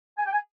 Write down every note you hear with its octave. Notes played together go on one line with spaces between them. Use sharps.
G#5
G5
G#5